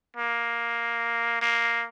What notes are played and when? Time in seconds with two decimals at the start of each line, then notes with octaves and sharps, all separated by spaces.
0.16 A#3
1.42 A#3